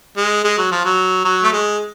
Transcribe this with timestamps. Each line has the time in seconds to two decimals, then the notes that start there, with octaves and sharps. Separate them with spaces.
0.17 G#3
0.44 G#3
0.58 F#3
0.72 F3
0.85 F#3
1.25 F#3
1.44 A3
1.53 G#3